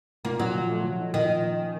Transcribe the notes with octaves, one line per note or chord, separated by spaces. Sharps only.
A#2 A#3
A#2 F#3
F3
A3
F3
D#4
A#2 D#3
F3
A#3
C#4